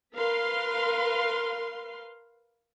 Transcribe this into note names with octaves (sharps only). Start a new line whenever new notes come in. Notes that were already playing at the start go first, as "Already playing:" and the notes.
A#4 B4 F5 C6